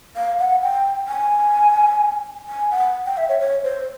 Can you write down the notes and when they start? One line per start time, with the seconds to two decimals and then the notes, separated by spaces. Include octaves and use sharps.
0.16 F5
0.39 F#5
0.62 G5
1.08 G#5
2.48 G#5
2.71 F#5
3.06 G5
3.17 E5
3.29 C#5
3.40 C#5
3.64 C5